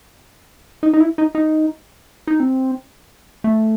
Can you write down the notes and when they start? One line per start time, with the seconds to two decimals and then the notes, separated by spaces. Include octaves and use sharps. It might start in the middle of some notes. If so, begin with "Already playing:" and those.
0.83 D#4
0.93 D#4
1.00 E4
1.18 D#4
1.35 D#4
2.27 D#4
2.40 C4
3.44 A3